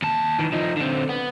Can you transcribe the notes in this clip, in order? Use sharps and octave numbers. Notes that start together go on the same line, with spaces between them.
D#2 A5
D#3 E3
F3 D#4
D3 C4
B3